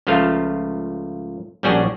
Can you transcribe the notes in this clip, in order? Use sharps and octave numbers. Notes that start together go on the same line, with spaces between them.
C#2 C#3 F3 A3 F4 F5
A#1 G3 C#4 D4 F#4 G#4